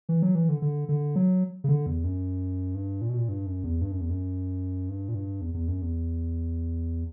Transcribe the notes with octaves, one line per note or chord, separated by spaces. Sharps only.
E3
F#3
E3
D3
D3
D3
F#3
C#3
D3
E2
F#2
G2
A#2
B2
A#2
G2
F#2
E2
G2
F#2
E2
F#2
G2
A#2
G2
E2
E2
F#2
E2